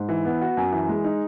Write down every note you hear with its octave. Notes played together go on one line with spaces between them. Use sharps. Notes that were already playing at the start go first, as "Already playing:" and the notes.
Already playing: G#2
E3
B3
F#4
F#2
E3
G#3
D#4